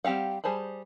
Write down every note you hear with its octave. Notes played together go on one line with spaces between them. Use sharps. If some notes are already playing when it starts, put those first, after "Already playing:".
G3 C4 G4 F5 F#5
G3 G#4 C5 A5 B5